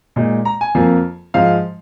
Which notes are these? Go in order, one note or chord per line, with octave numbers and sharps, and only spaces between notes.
A#2 G#3 D#4
A#5
G#5
F2 F3 A#3 F4
G#2 F3 G#3 F5